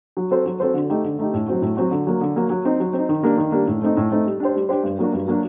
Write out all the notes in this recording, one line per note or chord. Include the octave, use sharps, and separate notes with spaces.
F#3
C4 F#4 A4 C5
F#3
C4 F#4 A4 C5
D3
A3 D#4 G4
D3
A3 D#4 G4
A2
F#3 C4 F#4
A2
F#3 C4 F#4
D3
F#3 A#3
D3
F#3 A#3
F#3
C4 D#4
F#3
C4
D#4
D#3
G3 A#3 D4
D#3
G3 A#3 D4
A2
A3 C4 D#4
A2
A3 C4 D#4
G3
D4 G4 C5
G3
D4 G4 C5
G2
F#3 A#3 D4 F#4
G2
F#3 A#3 D4 F#4